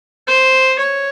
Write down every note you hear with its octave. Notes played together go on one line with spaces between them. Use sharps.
C5
C#5